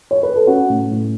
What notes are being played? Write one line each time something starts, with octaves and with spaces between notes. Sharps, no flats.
C#5
B4
A4
C#4 F#4
A2
A2